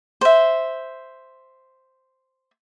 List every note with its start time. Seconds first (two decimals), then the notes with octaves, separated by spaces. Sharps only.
0.21 C5 E5